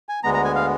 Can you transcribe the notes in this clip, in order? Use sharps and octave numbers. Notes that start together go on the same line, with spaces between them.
G#5
D2 D3 G#3 B3 A#5
A#5
G#5
F5